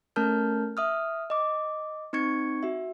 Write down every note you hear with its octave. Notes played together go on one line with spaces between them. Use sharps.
A3 C#4 A#4 A5 F6 G6
E5 D#6 F6
D#5 D6
C4 D#4 C#6 G#6 C#7
F#4 E5